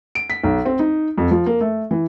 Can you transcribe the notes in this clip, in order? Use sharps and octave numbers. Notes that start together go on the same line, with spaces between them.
D7
B6
B1
C4
D#4
F2
F3
A#3
A3
E3